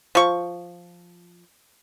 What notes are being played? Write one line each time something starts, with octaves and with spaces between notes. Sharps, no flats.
F3 C#6